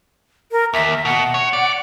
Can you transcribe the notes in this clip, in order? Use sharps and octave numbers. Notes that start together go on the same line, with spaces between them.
A#4
D#2 E5
B2 F#5
C#5
D5